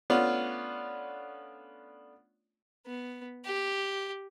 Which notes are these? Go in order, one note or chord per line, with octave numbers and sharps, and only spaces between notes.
A3 B3 C#4 D4 F4
B3
G4